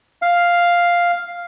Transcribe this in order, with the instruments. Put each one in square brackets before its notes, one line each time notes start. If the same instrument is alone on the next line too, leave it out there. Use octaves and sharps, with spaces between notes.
[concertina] F5